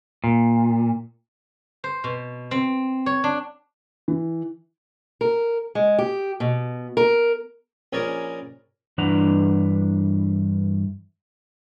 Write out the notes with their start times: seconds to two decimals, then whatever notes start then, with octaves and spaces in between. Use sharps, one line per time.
0.24 A#2
1.84 C5
2.04 B2
2.51 C4
3.06 C#5
3.24 D4
4.08 E3
5.21 A#4
5.75 G#3
5.98 G4
6.40 B2
6.97 A#4
7.93 A#1 C#4 G#4 A#4 D5
8.98 G2 E3 D4 B4 F#5 A#5